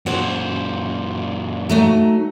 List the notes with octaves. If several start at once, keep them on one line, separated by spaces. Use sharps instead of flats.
F#2 A#2 C5 F#5
F#3 A3 D#4